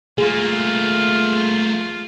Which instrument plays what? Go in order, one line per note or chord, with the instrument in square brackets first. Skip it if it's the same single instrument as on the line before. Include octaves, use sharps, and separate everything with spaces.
[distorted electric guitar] A3 A#3 [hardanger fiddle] F4 [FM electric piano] G#4